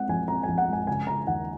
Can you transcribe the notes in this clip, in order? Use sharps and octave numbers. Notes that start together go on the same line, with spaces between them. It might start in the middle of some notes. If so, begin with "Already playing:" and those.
Already playing: G#3 C4 F#5
A#1 G#5
C4 A#5
A#1 G#5
F#5
G#3 G#5
C#3 G#5
C#3 A#5
D#2 F#5